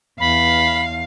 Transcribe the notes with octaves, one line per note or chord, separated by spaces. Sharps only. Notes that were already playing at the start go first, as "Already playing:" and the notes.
E2 F5 B5